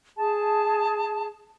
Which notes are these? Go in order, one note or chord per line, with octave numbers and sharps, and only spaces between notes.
G#4 A5